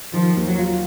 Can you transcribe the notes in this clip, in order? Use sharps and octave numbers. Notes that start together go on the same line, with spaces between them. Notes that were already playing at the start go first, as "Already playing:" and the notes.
D#3 F3
D#2
F#3
F4